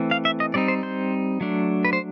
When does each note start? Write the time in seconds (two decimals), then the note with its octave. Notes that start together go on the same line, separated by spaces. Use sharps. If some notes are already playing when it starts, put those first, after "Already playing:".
Already playing: E3 A3 C4
0.11 F5
0.25 E5
0.40 D#5
0.54 G3 C4 D#4 D5
0.68 C5
0.83 C5
1.41 F#3 A3 D4
1.85 B4
1.93 C5